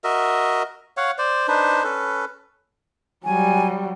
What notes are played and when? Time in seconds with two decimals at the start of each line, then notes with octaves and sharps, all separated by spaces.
0.04 F#4 A#4 D#5 E5
0.97 C#5 F5 F#5
1.18 C5 D5
1.48 D4 D#4 B4 C5
1.84 C#4 A4 B4
3.25 F#3 G3 G#5